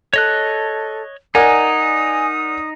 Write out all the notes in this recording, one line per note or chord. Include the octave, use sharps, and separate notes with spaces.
A4 C#5 D#5 F#6
D#4 A#4 D5 F#5 G#5 D#6